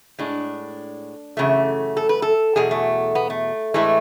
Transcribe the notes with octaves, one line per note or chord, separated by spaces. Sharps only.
A2 G#3 D4
F#2 C#3 E3 A3
A4
B4
A4
E2 B2 F#3 G#4
A3
B3
A3
A2 E3 G#3 A3